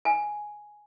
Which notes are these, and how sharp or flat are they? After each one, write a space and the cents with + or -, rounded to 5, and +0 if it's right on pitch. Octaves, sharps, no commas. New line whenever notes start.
G#5 +5